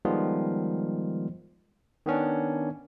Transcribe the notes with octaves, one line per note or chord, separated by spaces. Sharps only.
D#3 F3 G3 G#3 B3 F4
D#3 B3 C#4 D4